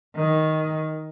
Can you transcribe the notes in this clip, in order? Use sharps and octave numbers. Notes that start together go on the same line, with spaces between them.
D#3